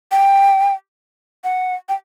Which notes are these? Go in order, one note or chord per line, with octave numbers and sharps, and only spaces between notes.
G5
F#5
G5